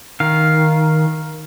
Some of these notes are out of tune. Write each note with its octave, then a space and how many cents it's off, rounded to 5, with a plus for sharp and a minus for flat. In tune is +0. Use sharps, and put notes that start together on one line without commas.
D#3 +10 F5 +0